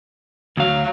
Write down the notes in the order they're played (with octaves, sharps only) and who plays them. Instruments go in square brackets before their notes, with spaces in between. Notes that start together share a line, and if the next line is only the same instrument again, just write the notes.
[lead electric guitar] D2 F5 [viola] F#3